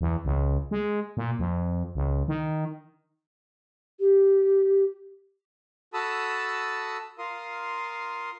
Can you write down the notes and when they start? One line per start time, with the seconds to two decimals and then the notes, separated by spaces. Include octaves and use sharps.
0.01 E2
0.25 C#2
0.71 G#3
1.17 A#2
1.39 F2
1.95 C#2
2.28 D#3
4.00 G4
5.94 F#4 A4 A5 B5 D#6 E6
7.19 F4 A#4 F5 C6 D#6